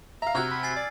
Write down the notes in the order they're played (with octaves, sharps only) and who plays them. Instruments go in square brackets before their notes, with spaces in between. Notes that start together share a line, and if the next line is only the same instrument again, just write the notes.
[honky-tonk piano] E5 F5 [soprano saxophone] A#5
[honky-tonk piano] C3 F#4 [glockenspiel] E6 F6 G#6
[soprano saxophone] B5
[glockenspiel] G#5 A6 C7
[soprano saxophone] D5